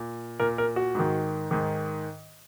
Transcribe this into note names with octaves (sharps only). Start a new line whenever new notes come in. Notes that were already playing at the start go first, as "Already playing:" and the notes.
Already playing: A#2
A#2 A#4
A#4
F#4
G#2 D#3
G#2 D#3